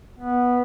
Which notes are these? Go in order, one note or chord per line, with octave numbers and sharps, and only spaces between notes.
B3